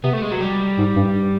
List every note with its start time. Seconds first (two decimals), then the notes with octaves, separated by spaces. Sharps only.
0.04 C3 B3
0.13 A3
0.22 G#3
0.32 F#3
0.41 G3
0.78 G#2
0.96 G2